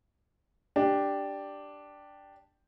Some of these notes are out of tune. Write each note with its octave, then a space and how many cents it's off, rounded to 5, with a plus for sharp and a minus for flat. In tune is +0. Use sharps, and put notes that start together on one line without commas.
D4 +0 G4 +0